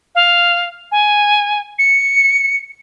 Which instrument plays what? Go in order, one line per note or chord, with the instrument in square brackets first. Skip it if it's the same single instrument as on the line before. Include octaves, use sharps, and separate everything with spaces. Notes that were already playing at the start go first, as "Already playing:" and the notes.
[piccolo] F5
G#5
C#7